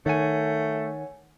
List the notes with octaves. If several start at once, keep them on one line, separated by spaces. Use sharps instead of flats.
D#3 A3 C#5 F#5 G#5